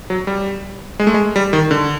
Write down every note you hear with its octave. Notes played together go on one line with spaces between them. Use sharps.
F#3
G3
G#3
A3
G#3
G3
D#3
D3